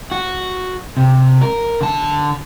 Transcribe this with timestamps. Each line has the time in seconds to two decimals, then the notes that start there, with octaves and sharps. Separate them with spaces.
0.12 F#4
0.97 C3
1.41 A#4
1.81 D3 A5